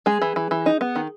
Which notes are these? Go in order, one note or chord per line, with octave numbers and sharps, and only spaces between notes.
G#3 G#4
E3
E3
E3
D#4
B3
D#3